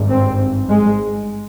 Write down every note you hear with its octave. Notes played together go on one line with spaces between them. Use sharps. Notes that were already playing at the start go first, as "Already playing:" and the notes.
Already playing: G#1 G2
C4
G#3